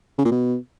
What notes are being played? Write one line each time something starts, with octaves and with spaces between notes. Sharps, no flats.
C#3
A#2
B2